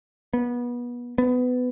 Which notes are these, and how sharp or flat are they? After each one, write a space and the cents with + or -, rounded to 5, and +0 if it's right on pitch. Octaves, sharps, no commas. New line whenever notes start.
B3 -25
B3 +20